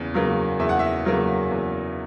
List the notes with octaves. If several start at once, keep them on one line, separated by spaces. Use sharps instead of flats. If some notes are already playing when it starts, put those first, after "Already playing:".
Already playing: E2 C#3
C#3 F#3 A#3
E2 E5
F#5
E5
C#3 F#3 A#3
E2